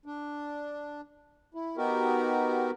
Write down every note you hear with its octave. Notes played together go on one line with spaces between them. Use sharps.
D4
E4
B3 D#4 F#4 G4 A#4